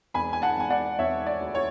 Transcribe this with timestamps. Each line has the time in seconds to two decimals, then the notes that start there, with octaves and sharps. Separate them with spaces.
0.14 E1 G#5 B5
0.33 G#5
0.42 F#5 A5
0.56 E1 G#5
0.70 D5 F#5
0.99 E1 C#5 E5
1.26 D5
1.40 D2
1.55 C#5